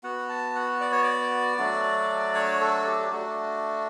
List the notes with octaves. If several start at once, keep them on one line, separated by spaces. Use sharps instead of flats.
B3 F#4 F#5
A5
F#5
D5
C#5
D5
F#3 A3 D4 F#4
C#5
A4
G4
G4
A3 D4 F#4